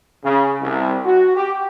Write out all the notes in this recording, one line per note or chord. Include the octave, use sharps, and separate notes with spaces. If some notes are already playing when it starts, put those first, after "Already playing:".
C#3
C2
F#4
G4